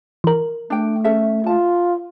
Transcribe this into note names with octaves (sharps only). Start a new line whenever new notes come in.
E3 A#4
A3 D4 G5
C#4 A4 E5
F4 A5